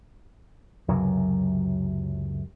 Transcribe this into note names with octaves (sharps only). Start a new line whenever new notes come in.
C#2 F#2 C3 F#3